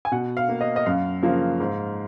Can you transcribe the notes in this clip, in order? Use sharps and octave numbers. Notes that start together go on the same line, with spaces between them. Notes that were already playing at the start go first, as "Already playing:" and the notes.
G#5
B2 F#5
F5
A#3
D#5
D#5
F#2 F5
C#3 F3 A#3
G#2